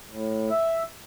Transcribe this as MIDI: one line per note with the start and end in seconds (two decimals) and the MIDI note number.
0.10 0.50 45
0.50 0.83 76